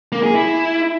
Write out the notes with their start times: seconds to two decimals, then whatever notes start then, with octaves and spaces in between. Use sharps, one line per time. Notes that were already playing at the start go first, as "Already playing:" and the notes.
0.12 A#3
0.23 G#4
0.34 E4